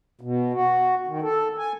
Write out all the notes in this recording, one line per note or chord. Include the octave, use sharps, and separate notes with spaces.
B2
F#4
D#3
A4
G#5